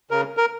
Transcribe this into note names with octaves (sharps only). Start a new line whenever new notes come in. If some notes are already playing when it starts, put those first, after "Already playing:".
C#3 A#4
A#4